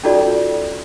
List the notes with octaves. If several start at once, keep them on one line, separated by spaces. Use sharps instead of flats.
C#4 D#4 F4 F#4 A4 D5